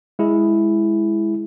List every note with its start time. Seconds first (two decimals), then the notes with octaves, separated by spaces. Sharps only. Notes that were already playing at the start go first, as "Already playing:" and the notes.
0.19 G#3 E4 G#4